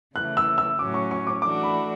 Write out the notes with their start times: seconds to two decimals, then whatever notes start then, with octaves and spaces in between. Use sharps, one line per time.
0.15 C#3 E3 A3 F#6
0.37 E6
0.58 E6
0.79 A2 F#3 C#4 D6
0.94 C#6
1.11 C#6
1.27 D6
1.42 E3 A3 D4 F#4 D6
1.63 B5